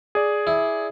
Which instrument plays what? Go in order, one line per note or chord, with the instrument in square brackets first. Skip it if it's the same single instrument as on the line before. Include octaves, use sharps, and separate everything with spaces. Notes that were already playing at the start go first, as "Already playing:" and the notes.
[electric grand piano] G#4 D5
[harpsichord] E4